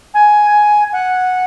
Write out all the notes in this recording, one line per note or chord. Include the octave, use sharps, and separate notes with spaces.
G#5
F#5